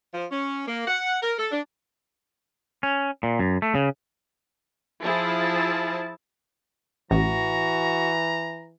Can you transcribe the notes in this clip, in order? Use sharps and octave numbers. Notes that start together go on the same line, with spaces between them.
F3
C#4
A#3
F#5
A#4
A4
D4
C#4
A#2
F#2
A3
C#3
F3 E4 G#4 A5
A1 E3 F#4 A#5